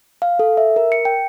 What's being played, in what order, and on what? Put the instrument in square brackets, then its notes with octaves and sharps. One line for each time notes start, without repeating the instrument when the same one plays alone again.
[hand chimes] F5
A4
E5
A#4
C#7
G5